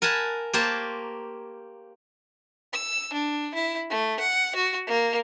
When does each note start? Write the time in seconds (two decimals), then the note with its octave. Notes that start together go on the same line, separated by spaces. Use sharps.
0.02 A#4 F#5 G#5 A5 B5
0.53 A#3 G4 C5 C#5 A5 A#5
2.73 E6
3.13 D4
3.54 E4
3.90 A3
4.20 F#5
4.56 F#4
4.87 A#3